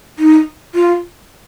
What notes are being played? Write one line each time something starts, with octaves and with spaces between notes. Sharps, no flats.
D#4
F4